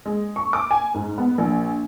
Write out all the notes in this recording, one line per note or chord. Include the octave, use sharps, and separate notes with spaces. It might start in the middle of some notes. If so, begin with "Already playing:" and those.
G#3
C#6
D6
G#5
G#2
B3
A#1